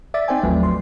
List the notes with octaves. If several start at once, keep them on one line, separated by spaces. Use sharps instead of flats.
D5 E5 D6 A6 B6
C4 D#4 C5 D5 G5 G#5
G#1 D#2 F3 F#3 A3 B4
C6